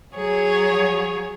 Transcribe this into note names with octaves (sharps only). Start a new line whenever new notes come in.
F#3 G#4 C#5